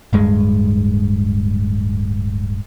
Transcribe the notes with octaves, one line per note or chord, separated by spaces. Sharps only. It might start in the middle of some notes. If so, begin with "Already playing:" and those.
D1 G2 G#3